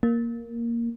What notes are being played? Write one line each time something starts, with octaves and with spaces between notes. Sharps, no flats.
A#3